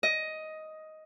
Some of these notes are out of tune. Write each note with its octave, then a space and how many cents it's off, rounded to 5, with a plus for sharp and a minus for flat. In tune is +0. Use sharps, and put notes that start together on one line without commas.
D#5 +10